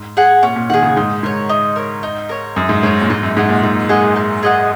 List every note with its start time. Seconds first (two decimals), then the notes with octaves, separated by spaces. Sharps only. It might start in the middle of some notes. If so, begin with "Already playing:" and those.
Already playing: G#2
0.17 G#4 F#5
0.43 A#2 C#4
0.56 A#2
0.70 D#3 G#4 F#5
0.83 C#3
0.97 G#2 D#4
1.23 G#2 A#4 C#5
1.49 D#4
1.76 A#4 C#5
2.03 D#4
2.29 A#4 C#5
2.56 F#2 D#4
2.69 G#2
2.83 G#2 A#4 C#5
3.02 A#2
3.10 G#2 D#4
3.23 F#2
3.37 G#2 G#4 D#5 F#5
3.49 A#2
3.63 G#2 D#4
3.89 G#3 G#4 D#5 F#5
4.16 D#4
4.43 G#4 D#5 F#5